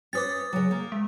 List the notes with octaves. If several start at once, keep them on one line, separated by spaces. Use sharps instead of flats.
C#4 B4 C5 D6 D#6 A6
C#3 F#3
A#3
G#3